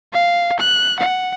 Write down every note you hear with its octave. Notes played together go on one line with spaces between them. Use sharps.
F5
F#6
F#5